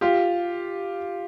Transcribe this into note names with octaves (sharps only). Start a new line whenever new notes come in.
F4 G4